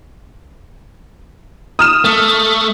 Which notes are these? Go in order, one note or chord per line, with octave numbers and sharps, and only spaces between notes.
D#6 F6 E7
A3